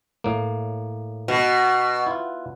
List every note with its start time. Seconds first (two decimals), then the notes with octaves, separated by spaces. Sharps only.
0.24 A2 A#3
1.28 B2
2.07 E4 F4